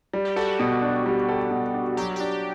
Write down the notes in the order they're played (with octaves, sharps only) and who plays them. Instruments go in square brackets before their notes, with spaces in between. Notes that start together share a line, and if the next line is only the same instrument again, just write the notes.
[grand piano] G3
[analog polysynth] G4
[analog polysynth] F#4 [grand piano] A4
[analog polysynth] G4
[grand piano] B2
D4
G3
A4
B2
D4
[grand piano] F#3 [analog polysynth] G4
[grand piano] D4 [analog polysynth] G4